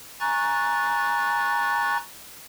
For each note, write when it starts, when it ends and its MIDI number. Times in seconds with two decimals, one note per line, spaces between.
0.20 1.97 80
0.20 1.97 82
0.20 1.97 85
0.20 1.97 90
0.20 1.97 93